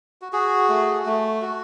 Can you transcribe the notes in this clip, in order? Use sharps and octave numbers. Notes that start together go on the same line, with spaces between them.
F#4
F#4 G#4
A3
A3
F#4